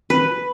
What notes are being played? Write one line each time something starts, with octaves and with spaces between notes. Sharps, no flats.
B4